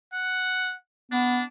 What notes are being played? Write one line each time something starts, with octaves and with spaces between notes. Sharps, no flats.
F#5
B3 D4